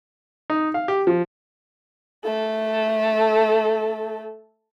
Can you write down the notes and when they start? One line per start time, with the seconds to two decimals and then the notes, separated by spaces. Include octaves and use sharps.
0.50 D#4
0.74 F5
0.88 G4
1.07 F3
2.24 A3 A4